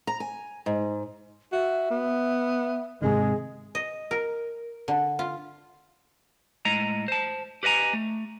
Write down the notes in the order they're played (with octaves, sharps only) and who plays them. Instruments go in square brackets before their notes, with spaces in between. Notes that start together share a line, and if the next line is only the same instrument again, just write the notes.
[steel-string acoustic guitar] A#5
G#5
G#2
[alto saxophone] F#4 [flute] E5
[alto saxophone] B3
[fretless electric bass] G#2 C3 D#3 [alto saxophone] G#3 [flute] G#4
[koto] D#5
A#4
D3
F4
[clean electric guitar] A2 G#3 D#5 A#5
C5 A5
G4 B4 D#5 G#5 A#5
A3